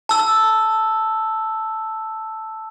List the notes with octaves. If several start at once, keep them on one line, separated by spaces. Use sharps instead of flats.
A5 E6